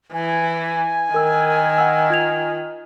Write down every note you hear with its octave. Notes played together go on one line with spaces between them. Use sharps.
E3 G#5
D#3 A#4 E6
F#5 E6
F4 G#6 F7